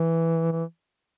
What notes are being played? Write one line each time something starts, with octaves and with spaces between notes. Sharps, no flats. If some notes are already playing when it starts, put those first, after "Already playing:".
Already playing: E3
E3